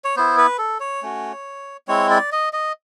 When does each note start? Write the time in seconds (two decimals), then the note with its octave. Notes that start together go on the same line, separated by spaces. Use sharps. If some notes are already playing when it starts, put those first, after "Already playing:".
0.04 C#5
0.16 B3 E4 C5
0.38 B4
0.58 A4
0.80 C#5
1.02 A3 C#4 F#4
1.88 G#3 C4 E4 C#5
2.11 D5
2.32 D#5
2.53 D#5